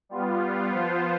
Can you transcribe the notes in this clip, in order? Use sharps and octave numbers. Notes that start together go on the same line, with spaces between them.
G3 B3 F4
F3 B3 F4 C5